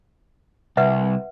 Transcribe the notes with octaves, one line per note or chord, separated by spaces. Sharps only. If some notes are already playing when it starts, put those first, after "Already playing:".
C2 B4 E5 F#5